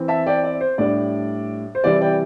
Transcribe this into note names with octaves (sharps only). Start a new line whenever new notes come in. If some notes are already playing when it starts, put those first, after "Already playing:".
Already playing: E3 C4 E4
E5 A5
D5 G5
D5
C5
A2 G3 D4 D5
C5
C3 E3 G3 E4 D5
D5 G5